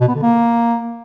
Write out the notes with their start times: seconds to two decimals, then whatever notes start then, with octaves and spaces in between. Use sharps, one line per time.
0.01 B2
0.08 B3
0.15 D3
0.22 A#3